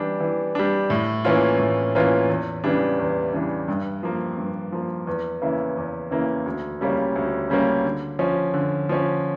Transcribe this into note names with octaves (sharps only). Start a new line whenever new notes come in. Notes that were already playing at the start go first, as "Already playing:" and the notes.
Already playing: E3 G3 D4
E3
G3 D4
A2
E3 A#3 C#4 F4
A2
E3 A#3 C#4 F4
E2
C#3 E3 G3 D4
E2
C#3 E3 G3 D4
G2
F3 A#3
G2
F3 A#3
E2
C#3 E3 A#3 E4
E2
C#3 E3 A#3 E4
D2
C#3 G3 A#3 C#4
D2
C#3 G3 A#3 C#4
D3
F3 C#4
D3
F3 C#4